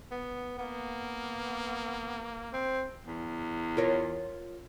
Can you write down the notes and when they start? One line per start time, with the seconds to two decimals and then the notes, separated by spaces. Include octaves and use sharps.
0.11 B3
0.58 A#3 B3
2.53 C4
3.06 E2
3.77 F4 A#4 C#5